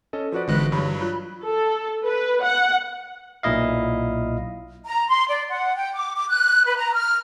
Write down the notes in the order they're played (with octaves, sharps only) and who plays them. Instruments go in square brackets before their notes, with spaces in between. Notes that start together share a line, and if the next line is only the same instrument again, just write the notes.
[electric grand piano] C#4 A4 D#5
[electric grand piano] F3 F#4 D5 [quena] B4
[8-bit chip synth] G#1 G#3 F#6 [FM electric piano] D3 E3 A#6 [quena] B4
[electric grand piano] G2 [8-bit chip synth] F#3 [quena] B5
[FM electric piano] F4 [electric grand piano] F#6
[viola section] A4
B4
F#5
[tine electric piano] B1 A#2 E4 D#5 F5
[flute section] A#5
C6
D5
F#5
G5
D6
D6
F#6
B4
A#5
F6